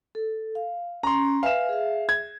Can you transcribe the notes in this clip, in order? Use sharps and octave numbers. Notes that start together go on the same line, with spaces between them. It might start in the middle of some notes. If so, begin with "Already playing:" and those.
A4
F5
C#4 A#5 C6
B4 E5 F5 G#5 E7
G#4 E5
G#6